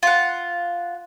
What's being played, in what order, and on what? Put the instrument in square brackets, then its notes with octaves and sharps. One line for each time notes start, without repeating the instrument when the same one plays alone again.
[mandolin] F4 F#5